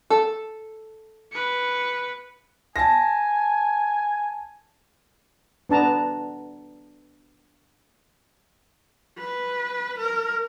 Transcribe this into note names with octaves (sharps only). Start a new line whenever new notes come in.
A4
B4 C#7
G#5 A5 A#6
B3 D4 A5 A#5
B4
A#4